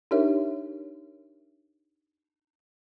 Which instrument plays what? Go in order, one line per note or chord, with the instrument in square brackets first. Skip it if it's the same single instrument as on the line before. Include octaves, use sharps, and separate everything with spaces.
[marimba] D4 D#4 G4 A#4 C#5 E5